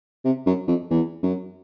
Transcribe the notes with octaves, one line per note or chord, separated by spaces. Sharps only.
C3
F#2
F2
E2
F#2